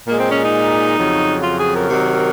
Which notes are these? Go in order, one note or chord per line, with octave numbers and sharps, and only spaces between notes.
A#2 G#3 A#3
C4
C#4
D#4
F2 C#3 F#3
F4
G#4
A#4
C3 D#3 F#3